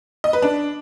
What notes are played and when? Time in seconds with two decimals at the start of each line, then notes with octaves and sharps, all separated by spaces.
0.24 D#5
0.33 B4
0.42 D4